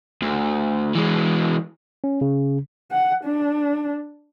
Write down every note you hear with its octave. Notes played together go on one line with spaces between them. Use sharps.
D2
E3 G#3
C#4
C#3
F#5
D4